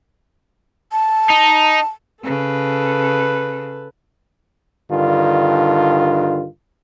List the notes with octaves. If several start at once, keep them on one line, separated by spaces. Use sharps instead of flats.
A5
D#4
C#3 A4 B4
G2 D3 D#3 F4